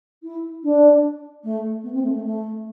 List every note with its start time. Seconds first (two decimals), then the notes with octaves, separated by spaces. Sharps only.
0.23 E4
0.63 D4
1.43 A3
1.83 B3
1.93 C4
2.03 A3
2.13 A3
2.24 A3